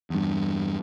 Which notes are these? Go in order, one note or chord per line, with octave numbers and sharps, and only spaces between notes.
E2 G2